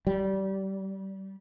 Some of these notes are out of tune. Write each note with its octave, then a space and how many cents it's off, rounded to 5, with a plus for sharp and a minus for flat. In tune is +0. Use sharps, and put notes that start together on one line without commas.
G3 -25